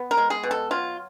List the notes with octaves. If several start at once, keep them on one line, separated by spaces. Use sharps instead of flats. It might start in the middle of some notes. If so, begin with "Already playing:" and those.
Already playing: B3
A#4
G#3
G#4
B2
A4
F#3 F4